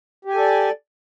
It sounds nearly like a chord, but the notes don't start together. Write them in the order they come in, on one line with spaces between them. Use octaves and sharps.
G4 G#5 A4 D5